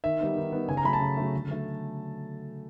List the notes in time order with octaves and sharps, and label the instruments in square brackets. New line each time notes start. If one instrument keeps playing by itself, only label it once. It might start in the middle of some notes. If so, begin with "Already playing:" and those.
[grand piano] D#3 E5
G3 B3 D#4
D#3
G3 B3 D#4
C#3 G#5
A#5
F#3 A3 B5
A5
C#3
F#3 A3
D3
F#3 A3